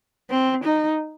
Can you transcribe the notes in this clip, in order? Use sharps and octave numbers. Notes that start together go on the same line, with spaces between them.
C4
D#4